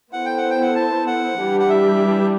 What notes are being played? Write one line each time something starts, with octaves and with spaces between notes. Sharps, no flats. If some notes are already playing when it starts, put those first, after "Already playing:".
B3 E4 A4 C5 F#5
G5
F#5
G5
F#5
A5
F#5
E3 G3 D4 G4
F#5
E5